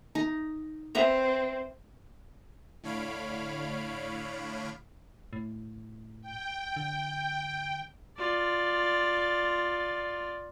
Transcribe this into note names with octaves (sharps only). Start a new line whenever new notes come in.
D#4
C4 B4 E5 A#5
A2 D3 C#5 F5 B5 D7
A2
G5
D3
F4 D5